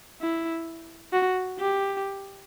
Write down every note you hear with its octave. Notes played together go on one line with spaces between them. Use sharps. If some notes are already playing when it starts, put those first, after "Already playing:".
E4
F#4
G4